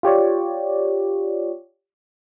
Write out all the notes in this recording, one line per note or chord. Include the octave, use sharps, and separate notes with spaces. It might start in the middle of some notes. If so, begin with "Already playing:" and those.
F4 G4 C#5 D5